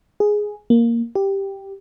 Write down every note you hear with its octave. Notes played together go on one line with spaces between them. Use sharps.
G#4
A#3
G4